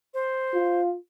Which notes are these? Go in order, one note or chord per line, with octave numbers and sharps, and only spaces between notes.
C5
F4